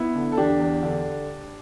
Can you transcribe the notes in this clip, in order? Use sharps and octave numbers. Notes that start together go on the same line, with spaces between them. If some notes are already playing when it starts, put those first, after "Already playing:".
Already playing: B3 E4
D3
A4
E2 D4 G4
E2
D3